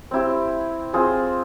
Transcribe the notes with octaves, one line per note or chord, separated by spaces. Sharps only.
C4 E4 G4
C4 F4 G#4 C5